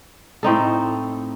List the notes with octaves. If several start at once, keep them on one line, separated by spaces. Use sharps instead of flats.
A2 C4 D#4 A4